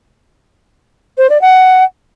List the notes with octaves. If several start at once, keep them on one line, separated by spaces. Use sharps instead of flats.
C5
D5
F#5